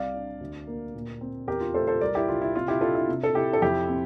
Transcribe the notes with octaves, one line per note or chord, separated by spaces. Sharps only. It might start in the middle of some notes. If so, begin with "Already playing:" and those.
Already playing: C2 C3 D5 F5
D4
D2
A#3
A#2
C4
E2 G4 A#4
F4
A3 A4 C5
A4 C5
C2 A#4 D5
E4 G4
C2 F4
E4
C3 F4
E4 G4
D4 F4 A4
E4
C3
A4
C3 E4 G4
A4
F2 E4 G4
C4